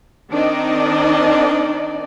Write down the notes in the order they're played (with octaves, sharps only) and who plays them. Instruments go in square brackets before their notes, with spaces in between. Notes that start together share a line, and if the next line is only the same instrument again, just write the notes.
[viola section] D#3 C4 D4 D#4 D5 D#5